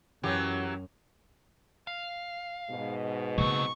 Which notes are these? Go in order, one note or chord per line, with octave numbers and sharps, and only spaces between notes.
F#2 E3 F#3 G4
F5
G#2 B2
C#3 F#3 A#3 C4 C#6